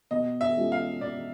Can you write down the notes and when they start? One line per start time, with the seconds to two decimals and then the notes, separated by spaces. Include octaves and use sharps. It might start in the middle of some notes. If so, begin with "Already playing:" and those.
0.11 B2 D#5
0.41 E5
0.56 G#3 C#4 F4 A4
0.72 F5
1.01 B2 D5